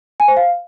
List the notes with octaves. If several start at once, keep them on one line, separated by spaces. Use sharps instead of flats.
G#5
C5
F5